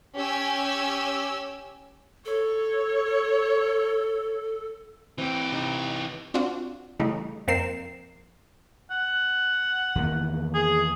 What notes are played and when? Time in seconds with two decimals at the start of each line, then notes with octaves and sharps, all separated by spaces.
0.16 C#4 G4 G#5 E6
2.25 A4 C#5
5.18 E3 C4 G4
5.52 C3 D#4
6.34 C4 D4 F4 F#4
7.00 C#3 E3 G3 A3 D#4
7.48 F2 A#3 C4 A#4 C7 E7
8.91 F#5
9.95 E2 D#3 A#3
10.54 G#4